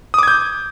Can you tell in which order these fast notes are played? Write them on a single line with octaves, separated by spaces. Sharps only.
D#6 D6 G#6 G6